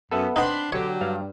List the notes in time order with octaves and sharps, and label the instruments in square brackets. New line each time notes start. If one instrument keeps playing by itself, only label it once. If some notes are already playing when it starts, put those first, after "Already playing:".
[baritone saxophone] F#2 [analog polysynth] B3 [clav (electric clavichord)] A4 B4 E5
[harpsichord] B3 D#4 [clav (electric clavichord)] C4 [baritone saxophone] D4 [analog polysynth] B5 C6
[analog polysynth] D3 G4 [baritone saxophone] F#3 [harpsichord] C#5
[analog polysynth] G2 [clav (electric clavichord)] G3 F5